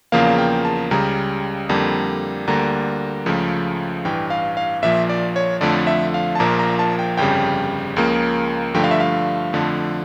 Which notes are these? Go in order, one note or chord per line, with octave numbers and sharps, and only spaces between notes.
E2 C#3 F3 A#3 F5
G5
A5
C#2 C#3 G3 A#5
F2 D3 G3 A#3
D2 D3 G3 A#3 A#5
C#2 C#3 F3 A3
A1 G2 E3 G5
F5
F5
A#1 A#2 F3 E5
D5
C#5
F2 D3 F3 A3 D5
E5
F5
A5
A#1 A#2 F3 A#3 A#5
A#5
A5
G5
G1 F2 C#3 G3 G5
C#2 C#3 F3 A#3
G2 D3 F3 A3 G5
F5
E5
F5
F2 D3 F3 A3